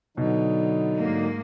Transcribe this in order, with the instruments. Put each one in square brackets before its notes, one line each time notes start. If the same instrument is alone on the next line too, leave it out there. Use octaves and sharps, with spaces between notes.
[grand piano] B2 [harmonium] D3 F#3 D#4
[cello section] G#2 A#3